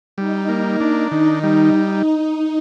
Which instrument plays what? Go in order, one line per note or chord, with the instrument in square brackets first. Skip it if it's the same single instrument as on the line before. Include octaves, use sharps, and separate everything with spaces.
[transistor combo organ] G3 [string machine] D#4
[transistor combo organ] A#3
D4
[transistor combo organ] D#3 [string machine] D#4
[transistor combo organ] G3